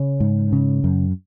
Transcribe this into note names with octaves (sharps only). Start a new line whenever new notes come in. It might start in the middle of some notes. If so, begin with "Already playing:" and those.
Already playing: C#3 C#4
G#2
C#3
F#2